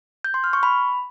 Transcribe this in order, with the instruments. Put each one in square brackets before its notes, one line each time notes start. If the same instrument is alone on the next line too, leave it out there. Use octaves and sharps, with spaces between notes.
[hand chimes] G6
C6
F6
C#6
B5